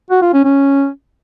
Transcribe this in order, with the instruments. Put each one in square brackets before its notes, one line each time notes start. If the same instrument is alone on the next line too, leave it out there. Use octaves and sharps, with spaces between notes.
[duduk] F#4
F4
C#4
C#4